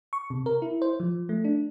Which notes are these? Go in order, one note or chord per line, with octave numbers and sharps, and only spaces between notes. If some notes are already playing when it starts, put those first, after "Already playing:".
C#6
C3
A#4
E4
C5
F3
A3
D4